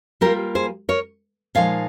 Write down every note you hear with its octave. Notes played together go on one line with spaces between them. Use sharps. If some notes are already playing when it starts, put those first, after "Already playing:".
G3 A#3 F4 G4 A#4
G#4 C5
A#4 C#5
A#2 F3 G#3 D#4 C#5 F5